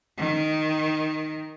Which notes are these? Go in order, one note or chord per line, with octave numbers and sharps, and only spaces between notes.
D#3